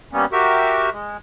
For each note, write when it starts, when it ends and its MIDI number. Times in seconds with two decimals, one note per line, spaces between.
0.13 0.25 55
0.13 0.25 58
0.13 0.25 59
0.13 0.25 61
0.32 0.90 66
0.32 0.90 67
0.32 0.90 70
0.32 0.90 76
0.91 1.17 56